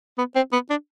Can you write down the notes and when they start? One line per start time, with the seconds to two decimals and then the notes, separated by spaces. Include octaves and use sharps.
0.18 B3
0.36 C4
0.53 B3
0.70 D4